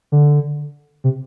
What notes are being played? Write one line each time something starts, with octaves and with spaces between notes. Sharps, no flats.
D3
C3